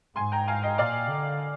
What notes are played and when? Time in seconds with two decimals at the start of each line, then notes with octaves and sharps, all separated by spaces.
0.16 G#2 G#5 C6
0.32 G5 A#5
0.47 F5 G#5
0.62 D#5 G5
0.78 A#2 D5 F5
1.09 D3